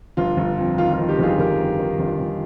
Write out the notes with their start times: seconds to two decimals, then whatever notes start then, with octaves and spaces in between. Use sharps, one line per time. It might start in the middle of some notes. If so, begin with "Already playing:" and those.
0.17 G1 F4
0.37 G1
0.57 F2
0.78 D#3 F4
0.93 F4
0.99 D#3
1.09 D#4 G4
1.19 G1 F4 G#4
1.39 G1 G4 A#4
1.59 G1
1.79 D#3
1.99 G1
2.20 G1